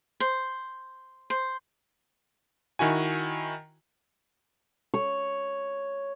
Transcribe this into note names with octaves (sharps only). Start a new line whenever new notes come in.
C5
C5
D#3 E4 F#4 G#5
C#5